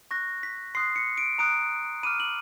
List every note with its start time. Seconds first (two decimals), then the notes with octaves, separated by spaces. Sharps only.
0.11 C#6 F#6 A#6
0.43 B6
0.75 C6 D#6 F#6 C7
0.96 C#7
1.18 D7
1.38 A#5 D#6 F#6 D7
2.03 B5 D6 F6 D#7
2.20 F#7